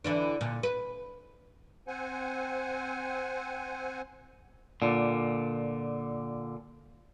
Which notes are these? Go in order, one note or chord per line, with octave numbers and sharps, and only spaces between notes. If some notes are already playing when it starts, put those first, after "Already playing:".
D3 E3 D4
A#2 D3
B4
C4 C5 F#5 G#5
A#2 D3